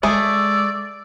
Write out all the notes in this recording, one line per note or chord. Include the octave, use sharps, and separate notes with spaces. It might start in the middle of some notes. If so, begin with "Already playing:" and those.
G#3 A3 G#4 D5 E6